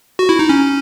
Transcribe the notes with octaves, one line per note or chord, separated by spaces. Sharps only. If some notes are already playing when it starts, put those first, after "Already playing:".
F#4
E4
D#4
C#4